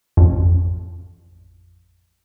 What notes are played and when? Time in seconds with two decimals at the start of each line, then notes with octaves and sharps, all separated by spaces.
0.17 A1 F2